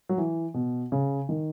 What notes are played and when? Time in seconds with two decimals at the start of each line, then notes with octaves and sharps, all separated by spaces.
0.09 F#3
0.18 E3
0.54 B2
0.92 C#3
1.29 D#3